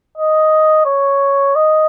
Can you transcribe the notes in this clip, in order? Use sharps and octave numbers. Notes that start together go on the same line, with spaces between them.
D#5
C#5
D#5